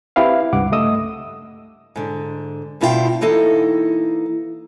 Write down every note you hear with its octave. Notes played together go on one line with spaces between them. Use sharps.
C4 E4 G4 B4 F5
C#2 G2 F#5 D6
A3 D#5 D#6 E6
G#2 D3
G2 B2 E4 F4 G#4 G5
E3 A#3 D#4 A4